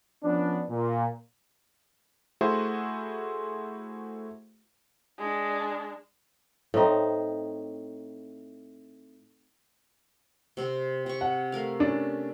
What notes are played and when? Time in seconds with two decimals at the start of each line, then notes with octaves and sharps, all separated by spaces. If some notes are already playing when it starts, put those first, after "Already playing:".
0.24 F3 B3 C#4 D4
0.70 A#2
2.41 A3 E4 F#4 G#4 C5
5.18 G#3 D4
6.74 A2 C4 D#4
10.57 C3 C4 C6
11.06 C3 C#6
11.21 F#5
11.52 A3 A#4 F5
11.80 C#4 D4